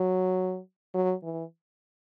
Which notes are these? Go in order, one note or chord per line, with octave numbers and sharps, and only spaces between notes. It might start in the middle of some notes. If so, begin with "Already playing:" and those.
Already playing: F#3
F#3
E3